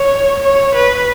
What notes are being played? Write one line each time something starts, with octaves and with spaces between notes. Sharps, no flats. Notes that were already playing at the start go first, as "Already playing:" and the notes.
Already playing: C#5
C#5
B4